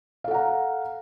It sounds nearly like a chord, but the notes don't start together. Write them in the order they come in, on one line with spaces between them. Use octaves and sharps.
F5 A4 F#5 A#5